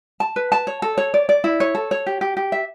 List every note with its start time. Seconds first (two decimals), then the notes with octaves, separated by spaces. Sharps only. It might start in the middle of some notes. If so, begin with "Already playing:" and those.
0.20 A5
0.36 B4
0.52 A5
0.67 C#5
0.82 A4
0.98 C#5
1.14 D5
1.29 D5
1.44 E4
1.60 C#5
1.75 A4
1.91 C#5
2.06 G4
2.21 G4
2.37 G4
2.52 E5